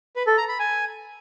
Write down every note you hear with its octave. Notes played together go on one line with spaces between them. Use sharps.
B4
A4
A#5
B5
G#5